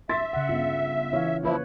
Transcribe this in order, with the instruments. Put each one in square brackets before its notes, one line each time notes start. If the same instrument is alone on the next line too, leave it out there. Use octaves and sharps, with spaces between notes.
[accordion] E5 [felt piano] C6 A6 B6
[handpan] C#3 F#5
[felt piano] G1 [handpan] F4
[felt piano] E3 F5 [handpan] C#5
[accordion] F3 E4 [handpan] A#3 B4 C#5